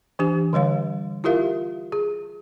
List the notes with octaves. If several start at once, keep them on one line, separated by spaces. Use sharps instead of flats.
E3 D4 G4 G#5
D3 G3 C#5 F5
E4 F4 G4 A#4 E5 F5
G#4